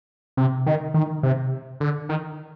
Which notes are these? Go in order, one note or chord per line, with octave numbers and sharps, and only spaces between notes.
C3
D#3
D#3
C3
D3
D#3